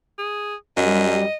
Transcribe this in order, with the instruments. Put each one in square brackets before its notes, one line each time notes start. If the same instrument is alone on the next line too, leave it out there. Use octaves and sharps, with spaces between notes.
[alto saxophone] G#4
[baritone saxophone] F#2 [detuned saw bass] G3 [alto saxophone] D#5